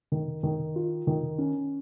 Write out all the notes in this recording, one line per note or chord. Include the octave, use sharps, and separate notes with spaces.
D#3
D#3
F4
D#3
C#4